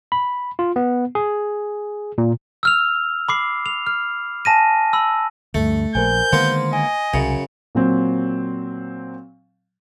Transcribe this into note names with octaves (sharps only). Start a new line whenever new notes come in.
B5
F4
B3
G#4
A#2
E6 F6 F7
B5 D6 C7
F7
F6
G#5 A5 A#6 D#7
B5 E6
D2 G2 A3
A#1 A#4 C5 G#5 G6
D3 D#3 G#3 A#3 B3 C5 C6
D#5 G#5
C2 F#2 C#3
A#2 F#3 C4